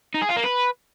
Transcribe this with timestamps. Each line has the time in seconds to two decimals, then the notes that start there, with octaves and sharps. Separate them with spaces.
0.14 D#4
0.22 G#4
0.29 F4
0.36 A#3
0.44 B4